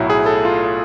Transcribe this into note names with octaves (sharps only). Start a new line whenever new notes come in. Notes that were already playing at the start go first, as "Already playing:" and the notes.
Already playing: B1 A2 F#3 A3 E4
G#4
A4
F4